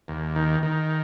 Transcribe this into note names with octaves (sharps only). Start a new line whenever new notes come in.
D#2
D#3
D#3